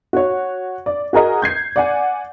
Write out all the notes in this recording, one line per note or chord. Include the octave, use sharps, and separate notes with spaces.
F#4 C#5
D5
F#4 G#4 A#4 D#5
G6 G#6 C7
D5 F#5 G#5